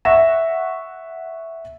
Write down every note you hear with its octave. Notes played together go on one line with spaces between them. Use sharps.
E5 F#5 C#6 A#6 E7